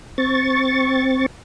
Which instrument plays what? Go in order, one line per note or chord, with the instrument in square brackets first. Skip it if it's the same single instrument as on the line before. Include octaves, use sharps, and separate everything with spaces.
[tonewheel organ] C4 C#6 A6